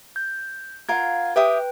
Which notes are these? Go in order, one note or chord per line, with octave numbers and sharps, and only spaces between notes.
G6
F4 A#4 F5 F#5 G#6
G4 B4 E5 G5 D#6